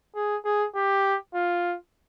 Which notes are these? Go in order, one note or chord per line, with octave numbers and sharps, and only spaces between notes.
G#4
G#4
G4
F4